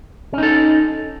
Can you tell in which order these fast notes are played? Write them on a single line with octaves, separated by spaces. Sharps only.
C#4 D#4 A4